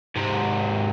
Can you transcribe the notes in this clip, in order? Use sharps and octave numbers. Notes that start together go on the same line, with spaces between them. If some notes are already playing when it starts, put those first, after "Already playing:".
G#2 C3